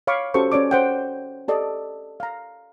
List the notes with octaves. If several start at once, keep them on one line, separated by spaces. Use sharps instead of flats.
C#5 F5 B5 C#6 D6
C#4 F#4 G4 A4 C5 C#6
C#4 C#5 D5 D6
C5 F#5 G5
G4 A4 D5 D#5
F5 A#5